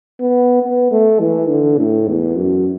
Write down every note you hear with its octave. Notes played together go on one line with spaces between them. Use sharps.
B3
B3
A3
E3
D3
A2
E2
F#2